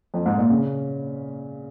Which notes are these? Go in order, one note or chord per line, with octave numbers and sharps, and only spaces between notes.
F2
G#2
A#2
C#3